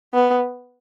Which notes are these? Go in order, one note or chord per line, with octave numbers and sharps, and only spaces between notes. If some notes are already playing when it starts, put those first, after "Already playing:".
B3